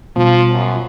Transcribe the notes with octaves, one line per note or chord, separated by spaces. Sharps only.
B2 F3 G3 B3 F4
F#2